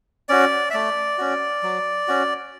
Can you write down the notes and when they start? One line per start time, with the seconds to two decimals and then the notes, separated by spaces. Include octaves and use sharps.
0.29 C#4 F#4 D5
0.70 E5
0.74 A3 D5
1.18 C#4 F#4
1.63 F#3
2.08 C#4 F#4